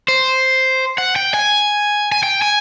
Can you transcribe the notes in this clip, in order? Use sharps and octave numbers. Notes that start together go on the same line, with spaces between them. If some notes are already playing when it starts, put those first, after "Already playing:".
C5
F#5
G5
G#5
G#5
G5
G#5